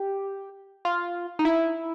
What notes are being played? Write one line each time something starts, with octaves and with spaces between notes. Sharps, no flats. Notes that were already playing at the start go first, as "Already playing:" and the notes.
Already playing: G4
F4
D#4
E4